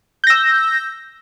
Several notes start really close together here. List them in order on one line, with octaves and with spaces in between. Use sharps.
G6 A#6 E6